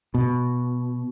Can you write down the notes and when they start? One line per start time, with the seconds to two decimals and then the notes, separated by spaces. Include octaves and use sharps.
0.14 B2